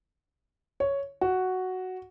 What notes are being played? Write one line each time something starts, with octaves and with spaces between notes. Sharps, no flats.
C#5
F#4